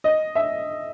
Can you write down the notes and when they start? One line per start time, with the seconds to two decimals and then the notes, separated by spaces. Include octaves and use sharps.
0.04 D#5
0.35 E5